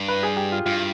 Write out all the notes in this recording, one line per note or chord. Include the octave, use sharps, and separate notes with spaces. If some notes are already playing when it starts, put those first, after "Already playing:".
Already playing: G2
B4
G#4
G4
F4
G2 F4